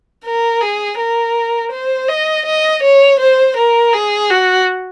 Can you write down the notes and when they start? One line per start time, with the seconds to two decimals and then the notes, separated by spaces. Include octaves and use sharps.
0.24 A#4
0.61 G#4
0.98 A#4
1.72 C5
2.08 D#5
2.45 D#5
2.83 C#5
3.19 C5
3.57 A#4
3.93 G#4
4.30 F#4